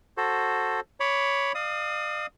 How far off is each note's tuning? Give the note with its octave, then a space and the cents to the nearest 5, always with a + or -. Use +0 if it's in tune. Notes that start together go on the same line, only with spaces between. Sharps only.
F#4 +0 A4 +5 C5 +15
C#5 +10 B5 +0 D6 +0
D5 +45 F5 +0 D#6 +15